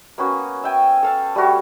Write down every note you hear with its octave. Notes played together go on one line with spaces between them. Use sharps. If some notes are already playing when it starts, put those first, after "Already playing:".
A#3 B3 C#4 F#4
E5 G5 G#5
A4 F5 A5
G3 A3 F#4 C#5